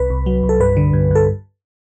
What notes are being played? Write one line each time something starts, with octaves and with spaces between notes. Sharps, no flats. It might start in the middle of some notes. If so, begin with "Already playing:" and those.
Already playing: C2 B4
C2
F#3
C2
A4
G2 B4
D3
G2
G2 A4